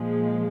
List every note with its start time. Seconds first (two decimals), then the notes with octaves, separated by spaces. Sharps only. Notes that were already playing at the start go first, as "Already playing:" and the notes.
Already playing: A#2 F3 G#3